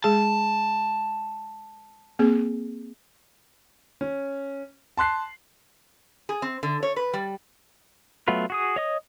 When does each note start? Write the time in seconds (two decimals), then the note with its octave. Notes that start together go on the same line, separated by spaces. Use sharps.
0.04 G#3 G#4 A5
2.19 A#3 C4 G#4
4.01 C#4
4.97 A5 C6 F#6 C7
6.29 G#4
6.42 C4
6.63 D3
6.83 C#5
6.96 B4
7.13 G3
8.28 F#3 A3 B3 F4 B4
8.50 F#4 G#4 D#6
8.76 C#5 D#5 D#6